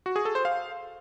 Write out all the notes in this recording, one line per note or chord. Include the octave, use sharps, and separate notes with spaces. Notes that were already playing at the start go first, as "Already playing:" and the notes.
F#4
G#4
A4
C5
F5